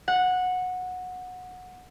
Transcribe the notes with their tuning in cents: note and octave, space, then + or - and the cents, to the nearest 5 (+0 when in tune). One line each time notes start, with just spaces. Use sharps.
F#5 -15